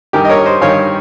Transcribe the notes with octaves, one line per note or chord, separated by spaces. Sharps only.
G2 D#3 G4 A#4
D#5
A#4 C#5
C5 D#5
G2 D#3 C#5 F5